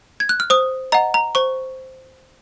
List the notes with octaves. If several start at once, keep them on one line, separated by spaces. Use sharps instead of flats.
G#6
F#6
F6
C5 D#6
D#5 F#5 A#5
A#5
C5 C#6